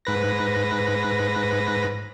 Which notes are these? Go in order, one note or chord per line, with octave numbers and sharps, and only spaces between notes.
G#2 B4 A#6